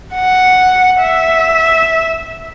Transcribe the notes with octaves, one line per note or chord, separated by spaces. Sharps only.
F#5
E5